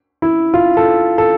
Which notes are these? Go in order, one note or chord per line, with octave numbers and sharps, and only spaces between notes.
E4
F4
A4
A4